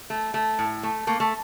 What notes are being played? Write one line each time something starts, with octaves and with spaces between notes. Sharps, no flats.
A3
A3
A2
A3
A3 A#3
A3